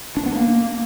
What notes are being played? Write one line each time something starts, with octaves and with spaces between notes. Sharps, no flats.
D4
B3
A#3